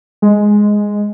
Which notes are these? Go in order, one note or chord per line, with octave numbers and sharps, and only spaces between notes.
G#3